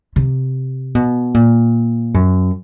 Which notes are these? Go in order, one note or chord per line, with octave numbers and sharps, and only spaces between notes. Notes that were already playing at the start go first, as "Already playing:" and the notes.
C3
B2
A#2
F#2